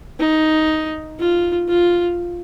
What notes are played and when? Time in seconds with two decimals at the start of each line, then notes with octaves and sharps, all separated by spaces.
0.20 D#4
1.20 F4
1.69 F4